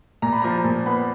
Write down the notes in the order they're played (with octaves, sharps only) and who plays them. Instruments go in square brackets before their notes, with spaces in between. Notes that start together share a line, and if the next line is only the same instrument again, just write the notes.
[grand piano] A#2 A#5
B5
F3 A#5
A#2
B3 B5